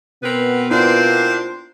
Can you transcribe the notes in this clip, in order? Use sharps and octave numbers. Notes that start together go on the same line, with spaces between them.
B2 B3 C4 A#4 B4
A#3 C4 D4 E4 F4 C5